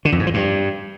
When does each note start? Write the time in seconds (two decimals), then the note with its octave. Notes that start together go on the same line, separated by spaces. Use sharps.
0.05 D3
0.12 F2
0.19 G#2
0.27 F3
0.34 G2